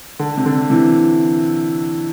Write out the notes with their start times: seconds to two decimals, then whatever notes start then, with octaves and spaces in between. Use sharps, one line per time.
0.19 D3
0.38 C3
0.46 D3
0.70 C3 E3